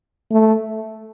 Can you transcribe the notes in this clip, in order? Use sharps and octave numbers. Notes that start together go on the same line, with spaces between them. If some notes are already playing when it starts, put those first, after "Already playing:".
A3